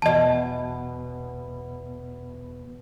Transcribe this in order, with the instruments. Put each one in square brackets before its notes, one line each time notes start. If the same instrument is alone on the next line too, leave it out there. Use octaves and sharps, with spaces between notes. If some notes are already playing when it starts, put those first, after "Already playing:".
[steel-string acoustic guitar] E2 B2 [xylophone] D#5 A5